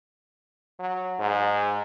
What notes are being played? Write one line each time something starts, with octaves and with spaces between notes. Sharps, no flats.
F#3
G#2